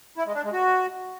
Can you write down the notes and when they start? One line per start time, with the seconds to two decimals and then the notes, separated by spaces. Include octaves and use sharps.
0.17 E4
0.26 G#3
0.35 D4
0.44 G#3
0.53 F#4